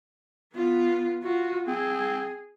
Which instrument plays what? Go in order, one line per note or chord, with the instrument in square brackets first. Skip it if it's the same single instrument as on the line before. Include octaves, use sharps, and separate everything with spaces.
[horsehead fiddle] B3 F4
F4 F#4
[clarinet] C4 [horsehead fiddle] G#4